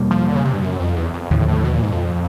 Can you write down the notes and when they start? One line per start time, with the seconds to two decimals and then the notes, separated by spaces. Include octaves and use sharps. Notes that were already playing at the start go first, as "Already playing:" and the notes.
Already playing: E2 B2 G3 A#3
0.11 F3
0.27 D3
0.35 C#3
0.45 C3
0.53 G2
0.62 F#2
0.79 F2
0.96 E2
1.14 F2
1.30 D#2 A2 D3 F3
1.48 A2
1.64 B2
1.73 A#2
1.82 G#2
1.91 F2